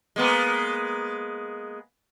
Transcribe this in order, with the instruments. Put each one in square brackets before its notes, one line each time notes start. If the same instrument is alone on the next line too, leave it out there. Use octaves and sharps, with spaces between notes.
[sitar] G#3 A#3 B3